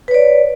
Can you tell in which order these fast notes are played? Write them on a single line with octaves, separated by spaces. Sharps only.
B4 C#5 D5